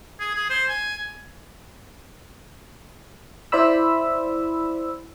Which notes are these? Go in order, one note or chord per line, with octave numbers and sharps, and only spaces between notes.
G#4
G#4
C5
G#5
E4 C5 D5 B5 E6